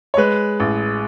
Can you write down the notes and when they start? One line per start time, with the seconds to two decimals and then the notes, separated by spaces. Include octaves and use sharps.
0.14 C#5
0.17 G#3 B4
0.60 A1